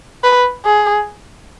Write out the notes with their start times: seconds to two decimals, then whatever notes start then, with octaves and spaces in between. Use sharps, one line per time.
0.24 B4
0.65 G#4